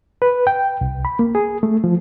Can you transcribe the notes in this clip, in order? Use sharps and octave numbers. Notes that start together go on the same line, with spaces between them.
B4
G5
C2
B5
A#3
G#4
A3
F3